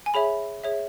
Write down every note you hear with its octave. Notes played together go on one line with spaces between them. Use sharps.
G#5
G#4 C#5 E5 B5
G#4 C#5 E5